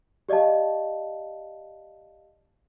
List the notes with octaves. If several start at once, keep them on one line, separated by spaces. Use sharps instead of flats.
G4 D5 D#5 F5 A5